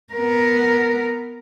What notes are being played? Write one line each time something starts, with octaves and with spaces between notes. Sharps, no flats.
B3 A#4